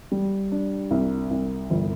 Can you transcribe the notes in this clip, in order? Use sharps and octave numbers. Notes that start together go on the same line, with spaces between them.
G3
D4
C2
C2
G1